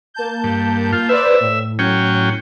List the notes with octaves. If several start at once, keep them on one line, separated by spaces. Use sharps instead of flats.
A#3 A5 G6
G2
F4
B4 C5 D5 E5
A2
F#3 C#4 G5